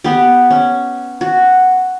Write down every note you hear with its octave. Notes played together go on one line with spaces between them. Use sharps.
B3 G4
C#4
F#4